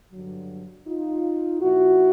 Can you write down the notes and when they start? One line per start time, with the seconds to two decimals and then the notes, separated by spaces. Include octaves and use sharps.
0.13 G2 D3 F#3
0.87 D#4 F4
1.61 A#2 F3 E4 F#4